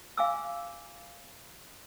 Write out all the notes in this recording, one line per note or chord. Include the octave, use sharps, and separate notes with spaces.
F5 G#5 D6 E6